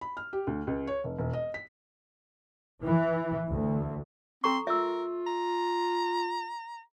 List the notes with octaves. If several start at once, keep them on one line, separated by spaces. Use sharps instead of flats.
B5
F6
G4
D2
C#2
C#5
F1
E1
D#5
B6
E3
D2
C4 A4 A#5 C6 C#6
F4 A#4 E5 E6
A#5